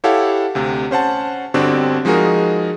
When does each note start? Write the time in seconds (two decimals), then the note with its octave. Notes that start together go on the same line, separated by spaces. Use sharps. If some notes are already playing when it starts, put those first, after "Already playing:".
0.04 E4 G4 A4 C#5 F5 F#5
0.55 D2 C3
0.91 C#4 C5 F#5 A5
1.54 G1 D3 C4 D4 F#4 G4
2.05 F3 G#3 D#4 F#4 G#4 A#4